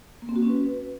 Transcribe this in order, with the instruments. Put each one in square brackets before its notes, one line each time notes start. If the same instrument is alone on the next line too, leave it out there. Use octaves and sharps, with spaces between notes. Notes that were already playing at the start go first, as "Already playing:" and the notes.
[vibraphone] A#3
C4
F#4
C#4
B4